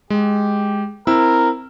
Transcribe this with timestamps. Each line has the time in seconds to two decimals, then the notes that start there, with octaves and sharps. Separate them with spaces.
0.10 G#3 G4
1.07 C4 E4 A#4 E6